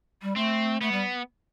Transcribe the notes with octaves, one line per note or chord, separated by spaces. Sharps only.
G3
A3 C4
A3 B3
G3